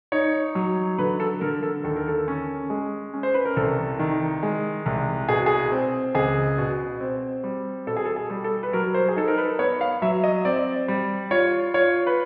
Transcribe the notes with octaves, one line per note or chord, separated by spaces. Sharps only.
D#4 C#5
F#3
D3 B4
A4
D3 A#4
A4
D#2 A4
A#4
A4
C#4
G#3
C#4
C5
B4
A#4
C2 A4
D#3
G#3
C2
B2 G#4
G#4
C4
C#2 G#4
B2
C4
G3
B2 A4
G#4
A4
G#4
G3
A4
B4
F#3 A#4
C5
G#4
D#4 A4
A#4
B4
B3 C#5
F5
F#3 E5
D#5
C4 D5
G3
F4 C#5
F4 C#5
B4